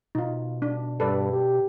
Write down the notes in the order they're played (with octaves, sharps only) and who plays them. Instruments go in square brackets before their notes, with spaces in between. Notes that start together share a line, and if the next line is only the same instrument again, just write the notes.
[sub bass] B2 [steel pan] D#4 F4
[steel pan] D4
[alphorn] G2 [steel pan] A4 B4 D5
[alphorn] G4